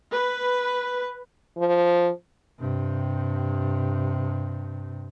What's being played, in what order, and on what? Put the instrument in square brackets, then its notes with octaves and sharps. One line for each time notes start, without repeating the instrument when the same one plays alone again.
[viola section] B4
[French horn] F3
[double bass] G2 C3